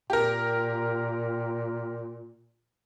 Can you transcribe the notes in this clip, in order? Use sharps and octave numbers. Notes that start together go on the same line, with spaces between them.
A#2 G4 A#4